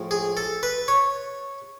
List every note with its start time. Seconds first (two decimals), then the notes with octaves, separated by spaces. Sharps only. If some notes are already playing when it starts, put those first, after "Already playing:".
Already playing: A2 F3 G#3
0.11 G#4
0.37 A4
0.63 B4
0.88 C#5